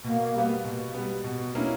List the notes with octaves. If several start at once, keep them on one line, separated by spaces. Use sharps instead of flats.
B2 A#3
G3 B3
B2
G3 B3
B2
B3
A#3 C#4 D4 E4